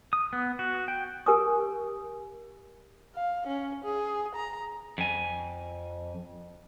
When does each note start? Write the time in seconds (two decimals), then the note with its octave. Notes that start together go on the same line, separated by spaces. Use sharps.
0.13 D#6
0.33 B3
0.59 F#4
0.88 G5
1.26 G4 A#4 G#5 C#6 D#6
3.15 F5
3.47 C#4
3.84 G#4
4.35 A#5
4.98 F2 G#5